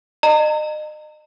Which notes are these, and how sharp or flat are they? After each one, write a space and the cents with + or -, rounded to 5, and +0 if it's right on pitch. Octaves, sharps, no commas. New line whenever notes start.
D#5 -35 A#5 -35